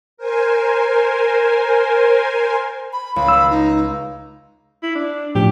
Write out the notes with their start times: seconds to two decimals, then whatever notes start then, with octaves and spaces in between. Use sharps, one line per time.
0.17 A#4 C5 G#5
2.93 B5
3.16 C#2 B5
3.28 E6
3.50 D#4
4.83 E4
4.95 D4
5.35 A2 F3 D4 G4